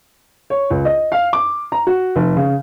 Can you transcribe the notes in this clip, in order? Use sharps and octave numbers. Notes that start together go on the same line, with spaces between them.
C#5
C#2
D#5
F5
D6
A#5
F#4
F1
C#3